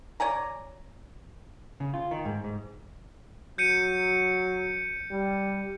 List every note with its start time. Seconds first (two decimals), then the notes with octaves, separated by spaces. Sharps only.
0.20 C#5 D5 G#5 A#5
1.80 C#3
1.94 F4
2.11 D#3
2.25 G#2
2.44 G#2
3.58 F#3 G6 C#7 D#7
5.11 G3